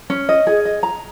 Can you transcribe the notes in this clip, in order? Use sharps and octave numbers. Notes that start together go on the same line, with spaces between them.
C#4
D#5
G#4
D#5
A#5